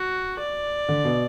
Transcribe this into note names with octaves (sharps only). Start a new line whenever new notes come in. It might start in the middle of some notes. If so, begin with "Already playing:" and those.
Already playing: F#4
D5
D3
B2